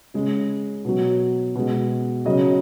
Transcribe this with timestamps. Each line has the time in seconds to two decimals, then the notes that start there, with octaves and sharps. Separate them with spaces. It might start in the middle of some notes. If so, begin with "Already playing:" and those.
0.14 C#3 G#3
0.85 B2 F#3
1.55 B2 G#3
2.25 C#3 F#3 D#5